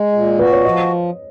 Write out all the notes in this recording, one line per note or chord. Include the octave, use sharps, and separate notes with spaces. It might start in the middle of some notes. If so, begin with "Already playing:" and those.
Already playing: G#3
A#2
F#4 B4
C#5
F3 D#5